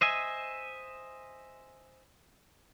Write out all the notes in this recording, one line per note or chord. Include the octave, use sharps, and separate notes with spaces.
C5 D#5 E5 G#5